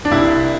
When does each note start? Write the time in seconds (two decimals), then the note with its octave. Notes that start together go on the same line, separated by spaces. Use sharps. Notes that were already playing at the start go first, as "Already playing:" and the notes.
0.05 D4
0.11 C2 E4